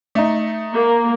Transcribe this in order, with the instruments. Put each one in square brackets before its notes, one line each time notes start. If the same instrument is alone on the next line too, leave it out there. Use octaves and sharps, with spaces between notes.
[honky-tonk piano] A3 D#4
[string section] A#3